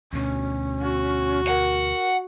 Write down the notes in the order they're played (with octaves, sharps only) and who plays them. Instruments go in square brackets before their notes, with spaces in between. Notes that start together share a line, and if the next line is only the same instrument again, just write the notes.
[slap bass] D2 B2 [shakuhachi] C#4
[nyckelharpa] F#4
[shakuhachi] A#4 [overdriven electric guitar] F#5